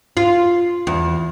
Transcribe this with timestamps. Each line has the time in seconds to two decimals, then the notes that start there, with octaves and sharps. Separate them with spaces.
0.17 F4
0.87 E2